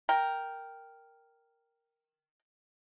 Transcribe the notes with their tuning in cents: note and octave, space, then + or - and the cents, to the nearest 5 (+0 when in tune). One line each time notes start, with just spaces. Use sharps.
A#4 +0 G5 +0